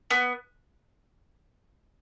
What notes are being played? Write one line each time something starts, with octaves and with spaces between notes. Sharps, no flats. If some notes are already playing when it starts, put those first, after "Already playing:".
B3